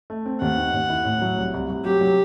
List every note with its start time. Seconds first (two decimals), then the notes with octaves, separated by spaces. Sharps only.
0.10 A3
0.26 C4
0.41 D#2 F#5
0.57 D#3
0.74 D#2
0.89 E4
1.05 A2
1.22 F#3
1.38 C2
1.54 C2
1.70 C2
1.85 F#3 G4
2.01 F#3